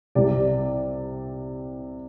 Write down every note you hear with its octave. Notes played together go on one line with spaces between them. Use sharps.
C2 C3 G3 D5